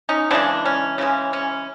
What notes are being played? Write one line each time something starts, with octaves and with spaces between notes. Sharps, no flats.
C#4 D#4
C#3 E3 G#3 C4 D4
C#4
C#3 E3 G#3 C#4
C#4